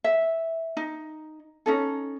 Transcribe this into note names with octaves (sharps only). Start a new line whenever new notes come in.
E5
D#4
C#4 D#4 A4